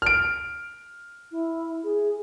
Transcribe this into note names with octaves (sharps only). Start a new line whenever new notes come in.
F6 D7
E4
G#4